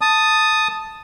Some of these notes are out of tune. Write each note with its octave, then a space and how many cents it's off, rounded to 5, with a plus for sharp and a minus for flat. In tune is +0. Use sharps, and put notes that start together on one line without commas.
A5 +0 D#6 +0